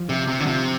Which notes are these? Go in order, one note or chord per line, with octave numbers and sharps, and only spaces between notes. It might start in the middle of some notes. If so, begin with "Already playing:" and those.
Already playing: F3
C3
C3
D3
C3